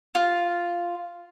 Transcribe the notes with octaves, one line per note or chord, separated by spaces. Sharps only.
F4